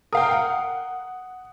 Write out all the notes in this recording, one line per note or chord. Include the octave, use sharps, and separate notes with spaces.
A#4 F5 G5 D#6
F#5